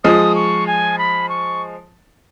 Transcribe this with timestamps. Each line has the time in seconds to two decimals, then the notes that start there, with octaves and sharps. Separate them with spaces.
0.04 F3 G#3 D#6
0.35 C#6
0.67 G#5
0.98 B5
1.29 C#6